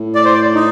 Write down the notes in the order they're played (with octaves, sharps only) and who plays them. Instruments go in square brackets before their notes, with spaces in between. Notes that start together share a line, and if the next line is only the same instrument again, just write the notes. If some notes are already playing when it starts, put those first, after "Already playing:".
Already playing: [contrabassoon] A2
[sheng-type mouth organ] D5
C5
D5
D#4